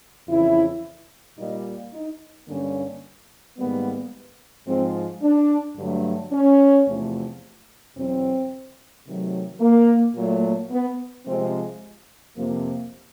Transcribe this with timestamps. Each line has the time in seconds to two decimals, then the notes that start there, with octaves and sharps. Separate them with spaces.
0.28 F2 C#3 E3 E4
1.38 A#2 G3 A#3 D#4
1.93 D#4
2.48 G2 D3 G3 A#3 C#4
3.57 G#2 D#3 G3 A#3 B3
4.67 G#2 F3 G#3 C4
5.22 D4
5.77 G2 D3 F#3 A3
6.32 C#4
6.87 E2 C3 F3 A3
7.96 E2 B2 F#3 C4
9.06 C3 D#3 F#3 A3
9.60 A#3
10.16 A#2 F#3 A3
10.71 B3
11.25 C3 F3 G#3 C4
12.35 F2 C3 F3 A#3